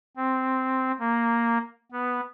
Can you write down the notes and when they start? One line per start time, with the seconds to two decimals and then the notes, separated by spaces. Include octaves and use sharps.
0.17 C4
0.99 A#3
1.92 B3